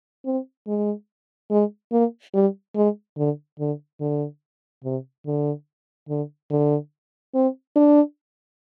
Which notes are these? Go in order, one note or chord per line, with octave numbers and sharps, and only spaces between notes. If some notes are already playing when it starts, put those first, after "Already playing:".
C4
G#3
G#3
A#3
G3
G#3
D3
D3
D3
C3
D3
D3
D3
C4
D4